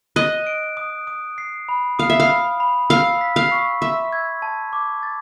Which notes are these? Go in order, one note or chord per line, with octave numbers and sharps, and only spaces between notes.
D#5 F#6
D7
D#6
D#6
C7
B5
F5 D#6
E5
F5
B5
B5
F5 E6
B6
F5
C#6
E5 C6
G#6
A5
D6
A6